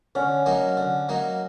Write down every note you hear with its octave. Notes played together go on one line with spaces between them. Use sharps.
D3 C#4
F#3 A#3 D#4
D3
F#3 A#3 D#4